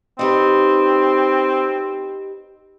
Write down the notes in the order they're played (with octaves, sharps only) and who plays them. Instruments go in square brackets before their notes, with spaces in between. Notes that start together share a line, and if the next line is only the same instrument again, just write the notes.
[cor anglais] C4 [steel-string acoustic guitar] D#4 G4 B4